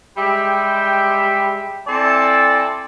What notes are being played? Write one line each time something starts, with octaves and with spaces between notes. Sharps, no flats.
G3 G#3 G4 E5 G5
C4 E4 A4 D5 G#5 A5